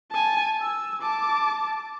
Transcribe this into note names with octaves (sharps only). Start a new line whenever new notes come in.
G#5 A5
E6
A5 D6